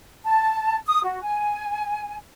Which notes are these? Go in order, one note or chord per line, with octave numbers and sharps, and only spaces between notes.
A5
D#6
F#4
G#5